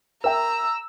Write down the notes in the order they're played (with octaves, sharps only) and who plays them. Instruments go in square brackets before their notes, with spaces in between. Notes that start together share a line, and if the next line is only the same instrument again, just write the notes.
[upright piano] A#4 E5 G5 [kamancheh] A#5 [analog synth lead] E6